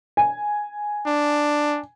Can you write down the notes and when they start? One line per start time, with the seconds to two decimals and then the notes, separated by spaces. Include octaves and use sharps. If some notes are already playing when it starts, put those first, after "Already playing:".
0.17 G#5
1.07 D4